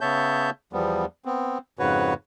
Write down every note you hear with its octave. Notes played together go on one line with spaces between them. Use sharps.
C#3 B3 C#5 E5 A5 G6
E2 F3 G3 B3
B3 C4
F2 G#2 C#3 F#4 B4 C#5